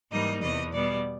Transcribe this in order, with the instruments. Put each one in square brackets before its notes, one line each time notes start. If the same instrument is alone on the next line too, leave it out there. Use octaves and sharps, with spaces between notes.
[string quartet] G#2 E3 G3 A#3 D#4 D#5
E2 C3 E3 D#5
B2 G3 B3 D5